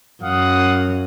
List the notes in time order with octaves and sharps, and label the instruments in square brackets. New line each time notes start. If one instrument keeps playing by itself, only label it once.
[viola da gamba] F#2 [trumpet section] F5 F#5 D#6